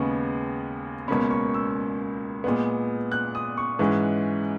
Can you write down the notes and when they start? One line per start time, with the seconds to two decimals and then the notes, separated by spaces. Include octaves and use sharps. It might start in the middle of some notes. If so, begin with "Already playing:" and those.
Already playing: D#2 C#3 G#3 B3 C#6
1.08 C#2 B2 A#3 C#4 B5
1.31 C#6
1.54 E6
2.44 A#2 G#3 B3
3.12 F#6
3.35 D#6
3.57 C#6
3.79 G#2 E3 G#3 C#4